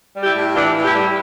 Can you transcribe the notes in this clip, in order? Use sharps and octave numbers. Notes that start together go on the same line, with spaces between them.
G3
E4 G4
A2
E3 D4 F4
A2
E4 G4
G3